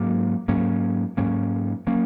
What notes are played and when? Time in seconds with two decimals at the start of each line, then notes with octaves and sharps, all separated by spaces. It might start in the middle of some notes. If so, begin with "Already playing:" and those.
Already playing: G#2 F#3 A#3 C#4
0.48 G#2 F#3 A#3 C#4
1.17 G#2 F#3 A#3 C#4
1.87 F#3 A#3 C#4